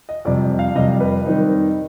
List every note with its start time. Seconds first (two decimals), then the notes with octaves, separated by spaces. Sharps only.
0.09 D#5
0.25 F2 C3 G3 D5
0.59 F5
0.75 F2 C3 G3 D#5
1.00 B4
1.26 D#3 G3 C4 D#4